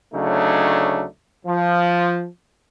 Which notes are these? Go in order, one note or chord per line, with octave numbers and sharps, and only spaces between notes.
D2 C#3 F#3 A3 D4 D#4
F3